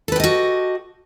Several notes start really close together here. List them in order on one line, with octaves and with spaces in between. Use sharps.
A4 B4 G4 D#5 F#4